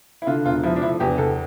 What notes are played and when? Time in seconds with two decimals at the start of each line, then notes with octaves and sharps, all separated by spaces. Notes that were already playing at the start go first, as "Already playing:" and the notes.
0.22 E4
0.27 D3 F4
0.45 E1 F4
0.63 F3 E4
0.76 D4
0.82 D3 E4
1.00 E2 G4
1.18 E2 A4